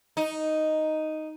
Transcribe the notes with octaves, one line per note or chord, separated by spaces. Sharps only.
D#4